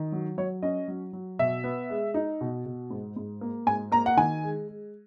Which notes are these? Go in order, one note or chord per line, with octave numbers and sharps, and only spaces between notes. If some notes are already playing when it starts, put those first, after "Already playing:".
Already playing: D#3
F#3
F#3 C#5
C#4 D#5
F#3
F#3
B2 E5
B3
G#3
D#4
B2
B2
G#2
G#2
A#3
G#2 G#5
A#3 A#5
F#5
D#3 G#5
G#3
G#3